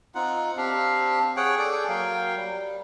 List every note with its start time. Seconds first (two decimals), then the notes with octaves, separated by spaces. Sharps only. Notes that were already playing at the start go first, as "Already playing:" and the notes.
0.15 C4 D#4 F4 F#5
0.57 C4 D4 G4 F5
1.37 G#4 C#5 F#5 G5
1.59 G#4 A4 D5 G5
1.89 F#3 A#3 F5 G5
2.36 G3